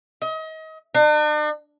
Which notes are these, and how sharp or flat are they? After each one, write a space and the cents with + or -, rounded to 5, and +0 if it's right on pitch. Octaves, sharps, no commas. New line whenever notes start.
D#5 +35
D4 +45